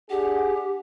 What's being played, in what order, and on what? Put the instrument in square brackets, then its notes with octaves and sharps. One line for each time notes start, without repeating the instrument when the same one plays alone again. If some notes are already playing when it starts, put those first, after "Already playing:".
[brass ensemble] D4 G#4 F#5 [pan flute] G4